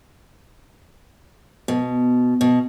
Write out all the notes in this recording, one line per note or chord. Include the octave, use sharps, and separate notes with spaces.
B2
B2